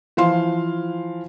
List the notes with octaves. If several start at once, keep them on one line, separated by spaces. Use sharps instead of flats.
E3 F3 F5 C6